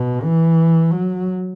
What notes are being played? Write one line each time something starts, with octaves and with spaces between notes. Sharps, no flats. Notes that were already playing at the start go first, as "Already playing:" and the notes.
Already playing: B2
E3
F#3